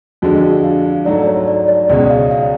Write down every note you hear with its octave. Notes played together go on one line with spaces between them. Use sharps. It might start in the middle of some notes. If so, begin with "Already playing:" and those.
F2 D3 G#3 D4 F#4
F5
G#2 F#3 A3 D5
C#5
D5
D5
C#2 B2 G#3 C#4 D5
F5
F5